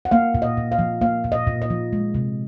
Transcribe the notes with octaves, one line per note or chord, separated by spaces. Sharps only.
F#5
A#3 F5
A#2
D#5
A#2
F5
F3
A#3 F5
A#2
D#5
A#2
D#5
F3
G#3
C3